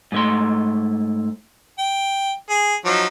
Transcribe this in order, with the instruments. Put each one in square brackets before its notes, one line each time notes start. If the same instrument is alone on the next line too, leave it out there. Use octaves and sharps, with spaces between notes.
[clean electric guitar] G#2 A3 C6
[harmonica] G5
G#4
F3 F#3 D#4